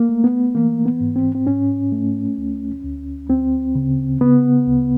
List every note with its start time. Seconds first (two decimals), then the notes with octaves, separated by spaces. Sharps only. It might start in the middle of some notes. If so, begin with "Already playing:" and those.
Already playing: A#3
0.09 A3
0.24 B3
0.55 E3 A#3
0.85 B3
1.00 G#2
1.16 C4
1.35 C4
1.47 G#2 C#4
1.92 A3
2.38 D2
2.84 D2
3.30 D2 C4
3.75 C#3
4.21 C#3 B3
4.67 D2